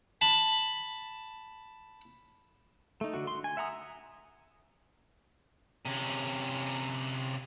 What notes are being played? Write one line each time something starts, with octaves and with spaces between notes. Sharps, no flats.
A5 B5
A3 D#4
D3 F#4
C6
G#5
E5 F#5 A#5 D#6
C3 C#4